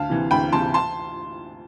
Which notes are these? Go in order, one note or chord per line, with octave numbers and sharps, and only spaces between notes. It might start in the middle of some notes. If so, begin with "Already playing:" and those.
Already playing: D2 F5 A5
C3 E3
D2 G5 B5
C3 E3 A5 C6
A5 C6